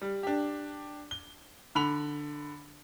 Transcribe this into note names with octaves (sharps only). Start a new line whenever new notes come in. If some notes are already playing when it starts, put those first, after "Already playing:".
G3
D4 G4
G7
D3 B5 F7